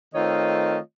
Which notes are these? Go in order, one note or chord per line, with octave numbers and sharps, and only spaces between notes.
D#3 A3 C4 F4 C#5 D#5